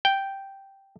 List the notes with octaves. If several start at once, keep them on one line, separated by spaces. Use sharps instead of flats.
G5